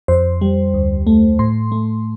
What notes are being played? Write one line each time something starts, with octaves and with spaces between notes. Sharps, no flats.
F2 C5
G3
D2
A3
A2 C6
A3